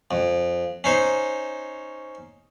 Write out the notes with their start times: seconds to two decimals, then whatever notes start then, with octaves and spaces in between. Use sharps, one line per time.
0.11 F2
0.84 C#4 D#4 C5